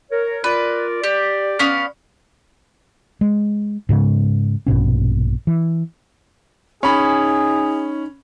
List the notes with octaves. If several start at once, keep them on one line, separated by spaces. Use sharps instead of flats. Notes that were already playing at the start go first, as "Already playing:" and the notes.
A#4 C#5
F4 A#4 B4 D5
G4 D5
B3 C#4 F5
G#3
G#2 C#3 G#3
A#1 G2 B2 C#4
E3
C#4 D#4 G#4 B5